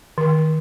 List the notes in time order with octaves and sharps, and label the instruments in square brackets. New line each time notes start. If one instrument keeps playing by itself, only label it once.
[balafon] D#3